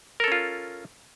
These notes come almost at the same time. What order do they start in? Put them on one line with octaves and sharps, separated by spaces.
A#4 A4 C#4 F4